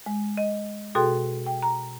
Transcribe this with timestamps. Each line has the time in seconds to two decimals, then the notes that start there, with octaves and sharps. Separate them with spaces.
0.06 G#3
0.37 D#5
0.95 B2 F#4 G#4 A4 G5 C6
1.46 G5
1.63 A#5